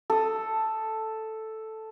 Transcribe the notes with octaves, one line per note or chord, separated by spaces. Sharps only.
A4 D#6